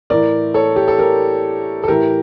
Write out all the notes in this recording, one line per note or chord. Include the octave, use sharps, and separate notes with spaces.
A2 E3 A#4 D5
A4 C#5
G4
A4
G4 A#4
A4
A2 E3 G4 A#4